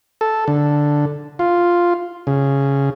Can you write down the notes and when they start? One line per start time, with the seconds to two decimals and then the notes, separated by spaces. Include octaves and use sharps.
0.21 A4
0.48 D3
1.39 F4
2.27 C#3